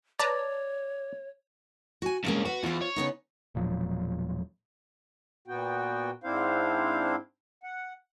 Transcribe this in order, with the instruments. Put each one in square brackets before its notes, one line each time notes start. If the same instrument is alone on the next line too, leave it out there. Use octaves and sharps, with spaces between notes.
[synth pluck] B4 A5 A#5 [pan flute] C#5 [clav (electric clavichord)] D5
[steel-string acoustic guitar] F#4 G#5
[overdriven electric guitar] G2 A#3 [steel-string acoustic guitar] B2 G#3 C#4
[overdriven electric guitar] F#4 [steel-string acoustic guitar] B4
[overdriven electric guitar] E2 [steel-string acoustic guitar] F4 C5
[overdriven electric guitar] C#5
[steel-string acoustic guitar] C#3 B3 D#4
[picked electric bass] E1 A#2 F3 F#3
[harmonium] A#2 B3 F#4 G5
G#2 C4 D4 E4 C5 F5
F#5